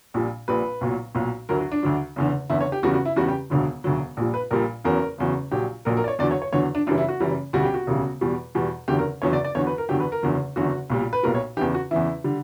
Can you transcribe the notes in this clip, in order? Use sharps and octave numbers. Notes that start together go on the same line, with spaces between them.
A#1 A#2 G3
A#1 A#2 G3 B4
B1 A#2 F#3
B1 A#2 F#3
D2 D3 F#3 A#4
F#4
D4
D2 D3 F#3
F#1 E2 D3
F#1 E2 D3 E4
C#5
G4
E2 C#3 G3 F#4
F#4
E4
E2 C#3 G3 F#4
G4
E1 D2 D3 F#3
E1 D2 D3 F#3
A#1 A#2 G3
B4
A#1 A#2 G3 A#4
F#1 E2 C#3 F#3 A#4
F#1 E2 C#3 F#3
A#1 A#2 F#3 G4
A#1 A#2 F#3 A#4
A#4
D5
C#5
E2 D3 F#3 D5
C#5
C#5
E2 D3 F#3 C#5
D4
F#1 F#2 E3 G3 D4
E4
F#4
F#1 F#2 E3 G3
E1 D2 C#3 G3 F#4
G4
F#4
E1 D2 C#3 G3
E2 B2 G3
E2 B2 G3
F#1 E2 D3 F#3 G4
A#4
F#1 E2 D3 F#3 C#5
D5
D5
E2 D3 F#3 C#5
B4
A#4
E2 D3 F#3 G4
B4
A#4
F#1 E2 D3 F#3
F#1 E2 D3 F#3 F#4
B1 A#2 G3
B4
B1 A#2 G3 A#4
C#5
E2 C#3 E3 G4
F#4
E2 C#3 E3 E4
D3 G3